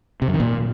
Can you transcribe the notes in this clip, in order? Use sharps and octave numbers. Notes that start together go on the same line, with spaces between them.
C3
F#2
D#3
A#2